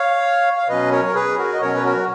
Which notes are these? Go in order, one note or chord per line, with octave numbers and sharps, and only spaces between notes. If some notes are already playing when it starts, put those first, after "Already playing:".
Already playing: C#5 F5
F5
B2 F#3 C#4 B4 D#5
A#4 C#5
A#4
G#4 B4
F#4 A#4
D#5
B2 F#3 C#4 A#4 C#5
B4
F#4 A#4